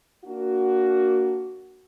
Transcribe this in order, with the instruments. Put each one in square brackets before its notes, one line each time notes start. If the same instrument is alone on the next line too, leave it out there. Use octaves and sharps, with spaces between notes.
[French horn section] A#3 D4 F#4